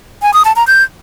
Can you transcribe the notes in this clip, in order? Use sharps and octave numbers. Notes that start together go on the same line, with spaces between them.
G#5
D#6
A5
A#5
G6